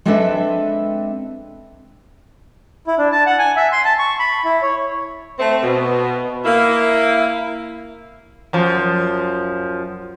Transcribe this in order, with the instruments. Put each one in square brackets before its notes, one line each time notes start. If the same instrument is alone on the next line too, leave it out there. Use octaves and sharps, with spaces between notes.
[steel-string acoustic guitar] G#3 C4 D4 A4 B4 E5
[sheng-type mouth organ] E4
D4
A5
F#5
G#5
E5
C6
A5
C#6
B5
E4
C#5
[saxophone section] A3 C4
B2
A#3 E4
[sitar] F#2 F3